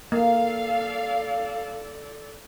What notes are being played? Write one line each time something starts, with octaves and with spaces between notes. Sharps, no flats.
A#3 A4 D5 F5